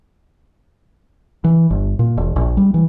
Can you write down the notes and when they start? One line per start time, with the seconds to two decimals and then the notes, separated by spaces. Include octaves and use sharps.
1.44 E3
1.70 G1
1.99 A#2
2.17 E1
2.36 A#1
2.57 G3
2.74 E3